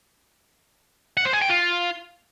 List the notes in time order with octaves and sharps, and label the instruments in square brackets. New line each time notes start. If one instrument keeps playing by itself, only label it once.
[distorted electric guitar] F#5
C5
G#4
G5
F4